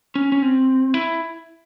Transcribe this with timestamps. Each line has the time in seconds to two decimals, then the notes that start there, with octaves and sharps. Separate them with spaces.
0.15 C#4
0.32 C#4
0.42 C4
0.94 E4